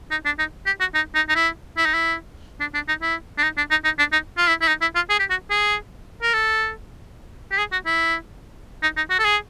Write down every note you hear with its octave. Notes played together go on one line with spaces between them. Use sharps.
D#4
D4
D#4
G4
F#4
D#4
D#4
D#4
E4
E4
D#4
E4
D4
D4
D#4
E4
D4
D#4
D4
D#4
D#4
D4
D#4
F4
E4
E4
D#4
E4
F4
G#4
G4
F#4
G#4
A#4
A4
G4
G#4
F#4
E4
D#4
D#4
F#4
A4
G#4